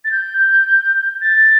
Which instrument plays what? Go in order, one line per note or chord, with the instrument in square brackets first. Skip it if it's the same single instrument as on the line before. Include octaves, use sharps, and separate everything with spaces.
[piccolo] A6
G6
A6